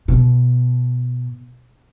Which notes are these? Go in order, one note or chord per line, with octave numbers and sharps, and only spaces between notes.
B2